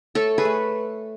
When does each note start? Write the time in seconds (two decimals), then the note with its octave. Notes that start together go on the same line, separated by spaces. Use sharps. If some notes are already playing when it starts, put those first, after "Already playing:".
0.15 A3 A4 C#5
0.38 G#4 B4
0.45 A3